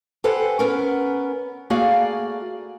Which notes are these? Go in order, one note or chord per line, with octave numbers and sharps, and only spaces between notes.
G4 A4 B4 C5 F#5 G#5
B3 C#4 A#4
A3 A#3 F#4 G#4 D5 F5